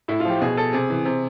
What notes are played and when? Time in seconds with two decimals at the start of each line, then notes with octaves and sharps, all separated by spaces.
0.08 A2 E4
0.20 F4
0.25 F3 G4
0.41 B2 G#4
0.57 A4
0.73 C3 G#4
0.90 E3
1.05 C3